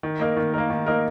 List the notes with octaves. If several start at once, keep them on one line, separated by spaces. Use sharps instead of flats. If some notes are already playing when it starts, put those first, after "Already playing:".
D#3
A#3 D#4 A#4
D#3
A#3 D#4 A#4
D#3
A#3 D#4 A#4